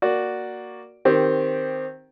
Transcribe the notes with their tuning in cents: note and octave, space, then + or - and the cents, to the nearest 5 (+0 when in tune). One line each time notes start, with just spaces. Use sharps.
A#3 +0 F#4 +0 D5 +0
D#3 +0 C4 +0 G4 +0